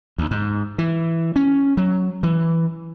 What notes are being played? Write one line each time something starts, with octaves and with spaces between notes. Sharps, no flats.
D2
G#2
E3
C#4
F#3
E3